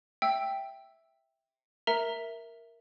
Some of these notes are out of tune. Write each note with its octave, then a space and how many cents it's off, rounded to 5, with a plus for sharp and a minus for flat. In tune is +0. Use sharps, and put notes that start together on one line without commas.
E5 +0 G5 +0 E6 +0
A#4 +0 E5 +0 A#5 +0